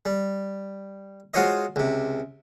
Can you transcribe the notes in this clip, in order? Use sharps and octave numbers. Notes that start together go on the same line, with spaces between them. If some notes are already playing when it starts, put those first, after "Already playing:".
G3
G#3 F4 F#4 C5 C#5 D#5
C#2 C3